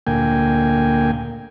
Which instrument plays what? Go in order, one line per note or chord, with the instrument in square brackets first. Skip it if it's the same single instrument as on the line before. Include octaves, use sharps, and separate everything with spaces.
[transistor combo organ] D2 A#2 A#3 G5 G#5